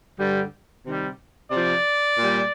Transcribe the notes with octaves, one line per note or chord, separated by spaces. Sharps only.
G2 D3 G3
C3 D#3 G3
C3 F3 D5
A#2 G3